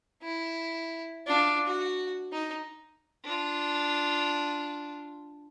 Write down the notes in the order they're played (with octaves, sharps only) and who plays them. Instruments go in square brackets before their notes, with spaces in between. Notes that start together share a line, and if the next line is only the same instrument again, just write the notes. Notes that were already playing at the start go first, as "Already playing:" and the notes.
[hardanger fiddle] E4
D4 F4
F#4
D#4
D4 F4